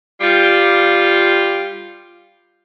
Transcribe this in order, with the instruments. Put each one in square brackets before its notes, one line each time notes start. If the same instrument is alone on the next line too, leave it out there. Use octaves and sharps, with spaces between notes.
[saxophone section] G3 F4